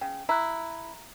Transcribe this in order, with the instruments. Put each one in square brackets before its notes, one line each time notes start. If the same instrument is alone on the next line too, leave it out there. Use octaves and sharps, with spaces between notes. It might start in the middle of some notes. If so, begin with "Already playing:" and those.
[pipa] C#3 [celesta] G5
[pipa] E4 [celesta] A#5 F#6